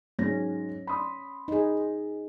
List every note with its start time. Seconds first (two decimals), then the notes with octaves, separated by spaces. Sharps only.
0.19 G#2 F#3 C#4 A#6
0.87 B5 C6 D#6
1.48 D#4 G#4